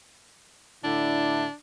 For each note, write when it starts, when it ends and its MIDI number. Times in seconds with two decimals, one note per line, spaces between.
0.84 1.46 45
0.84 1.46 50
0.84 1.54 62
0.84 1.46 64